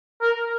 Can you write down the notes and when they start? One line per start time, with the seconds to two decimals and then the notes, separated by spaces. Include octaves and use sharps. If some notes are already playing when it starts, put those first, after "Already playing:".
0.21 A#4